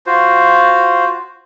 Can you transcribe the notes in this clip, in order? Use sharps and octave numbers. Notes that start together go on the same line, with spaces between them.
F4 F#4 C5